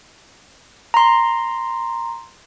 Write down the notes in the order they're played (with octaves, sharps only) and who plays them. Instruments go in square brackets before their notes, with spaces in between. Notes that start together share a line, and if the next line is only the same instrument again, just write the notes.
[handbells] A#5 C6